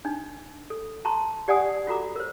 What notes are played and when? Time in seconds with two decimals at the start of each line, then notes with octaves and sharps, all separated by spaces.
0.05 D4 D#4
0.70 A4
1.05 A5 A#5 C6 C#6
1.48 G4 D5 F#5 G#5 D#6
1.87 F4 F#4 A4 A#5 D6
2.16 A#4 C5